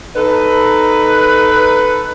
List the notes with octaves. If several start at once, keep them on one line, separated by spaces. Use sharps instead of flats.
D#4 A4 B4